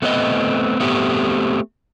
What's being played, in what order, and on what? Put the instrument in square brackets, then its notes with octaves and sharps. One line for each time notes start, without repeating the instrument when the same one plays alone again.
[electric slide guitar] A3 B3 C4 C#5 D#5
A3 B3 C4 G4